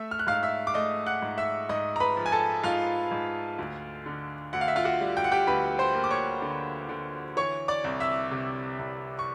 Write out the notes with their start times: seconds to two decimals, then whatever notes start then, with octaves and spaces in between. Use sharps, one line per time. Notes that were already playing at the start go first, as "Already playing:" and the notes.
Already playing: A3 E5 E6
0.11 F6
0.19 F#6
0.27 G#2 F5 F6
0.43 E5 E6
0.67 D6
0.74 A3 D#5 D#6
1.06 F#5 F#6
1.22 G#2
1.38 E5 E6
1.69 G#2 D#5 D#6
1.96 A#5
2.00 B4 B5
2.17 F3
2.26 G#5
2.32 A4 A5
2.63 G#2 F4 F5
3.11 G#2
3.58 D2
4.06 D3
4.53 D2 F#5
4.61 F5
4.68 E5
4.76 F4 F5
4.84 F#4 F#5
5.00 G3
5.17 G5
5.24 F#5
5.32 G4 G5
5.47 D2 B4 B5
5.79 C5 C6
5.95 A#3
6.04 D6
6.11 C#5 C#6
6.42 D3
6.89 D3
7.37 E3 C#5 C#6
7.68 D5 D6
7.84 C2
8.00 E5 E6
8.31 C3
8.79 C2
9.19 C#6